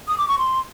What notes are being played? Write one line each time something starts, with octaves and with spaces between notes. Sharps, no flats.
D#6
D6
C#6
C6